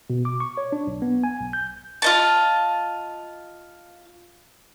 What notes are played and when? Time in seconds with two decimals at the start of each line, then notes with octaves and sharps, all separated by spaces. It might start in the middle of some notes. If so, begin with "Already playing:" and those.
0.10 B2
0.25 D6
0.40 C#6
0.57 C#5
0.72 D4
0.87 B1
1.02 B3
1.24 G#5
1.41 B1
1.53 G6
2.02 F4 D#5 A5